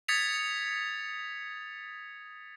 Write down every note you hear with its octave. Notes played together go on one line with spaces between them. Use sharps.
D#6 G#6 A6 B6 C#7 F7